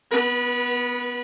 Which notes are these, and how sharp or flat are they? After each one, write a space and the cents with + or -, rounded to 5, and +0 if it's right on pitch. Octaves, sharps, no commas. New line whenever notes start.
B3 +0 B4 -30